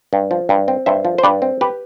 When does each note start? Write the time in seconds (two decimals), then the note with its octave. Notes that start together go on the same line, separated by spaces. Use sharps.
0.13 G2
0.31 F3
0.49 G2
0.68 C4
0.86 G2 C5 E5
1.05 F3
1.18 C5
1.23 G2 B4 D5
1.42 C4
1.61 G4 B4